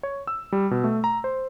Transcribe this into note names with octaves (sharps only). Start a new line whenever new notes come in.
C#5
E6
G3
B2
A3
A#5
C5